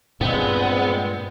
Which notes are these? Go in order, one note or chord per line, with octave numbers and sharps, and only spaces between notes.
G2 A#2 G#3 B3 C4